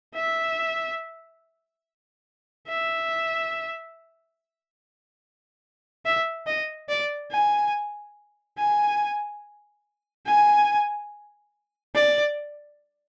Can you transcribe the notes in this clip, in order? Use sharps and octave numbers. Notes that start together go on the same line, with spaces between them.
E5
E5
E5
D#5
D5
G#5
G#5
G#5
D5